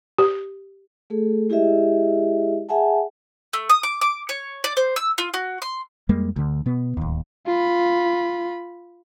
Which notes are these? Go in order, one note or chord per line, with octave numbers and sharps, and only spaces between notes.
G4
A3 G#4 A4
G#3 E4 G4 G#4 D#5 E5
G#4 E5 F#5 G#5 A5
A3
D#6
D6
D6
C#5
D5
C5
E6
F4
F#4
C6
F2 G3 G#3 A#3
D2 D3
B2 B3
D1 D#2
F4 B5